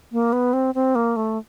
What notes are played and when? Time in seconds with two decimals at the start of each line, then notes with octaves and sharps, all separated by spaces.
0.12 A#3
0.33 B3
0.53 C4
0.75 C4
0.95 A#3
1.16 A3